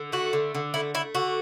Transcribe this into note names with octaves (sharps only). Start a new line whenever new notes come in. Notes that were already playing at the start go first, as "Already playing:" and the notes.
Already playing: D3
A3 F#4
D3
D3
A3 E4
A3 E4
D3 F#4